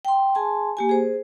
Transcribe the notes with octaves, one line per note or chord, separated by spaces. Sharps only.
G5 C6
G#4 G#5 A5 C6
A#3 G4 G#5
G#4 C5